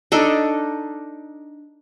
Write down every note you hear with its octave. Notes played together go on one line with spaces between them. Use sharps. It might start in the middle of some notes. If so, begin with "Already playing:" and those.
D4 D#4 A4